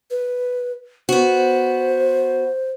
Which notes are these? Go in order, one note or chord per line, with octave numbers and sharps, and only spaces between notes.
B4
B3 F#4 C5